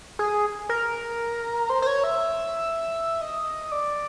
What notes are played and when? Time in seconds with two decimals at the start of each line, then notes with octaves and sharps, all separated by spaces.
0.19 G#4
0.69 A#4
1.70 C5
1.82 C5
1.87 C#5
2.04 E5
3.21 D#5
3.72 D5